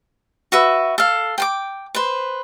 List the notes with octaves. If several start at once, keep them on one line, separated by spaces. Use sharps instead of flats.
F#4 B4 E5
A4 F5
G5 C6 D6
B4 C5